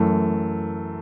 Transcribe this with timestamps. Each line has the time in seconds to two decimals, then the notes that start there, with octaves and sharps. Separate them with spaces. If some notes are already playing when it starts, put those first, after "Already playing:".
Already playing: F#2 E3 A3